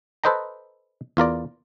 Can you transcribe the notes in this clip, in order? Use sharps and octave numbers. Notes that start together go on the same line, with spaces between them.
A4 B4 C5 D#5 G5 A#5
E2 F4 A#4 D5